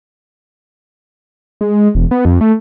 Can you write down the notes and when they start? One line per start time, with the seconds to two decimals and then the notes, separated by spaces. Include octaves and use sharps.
1.61 G#3
1.95 E1
2.11 B3
2.25 F2
2.41 A3